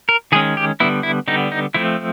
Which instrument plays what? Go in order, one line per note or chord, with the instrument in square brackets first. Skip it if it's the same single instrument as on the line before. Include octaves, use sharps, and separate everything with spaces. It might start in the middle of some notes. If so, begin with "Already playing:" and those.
[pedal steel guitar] A#4
D#3 G#3 C#4 G#4
G4
D3 G3 B3 E4
E4
D3 G3 B3 D#4
D#4
F3 A3 C4 E4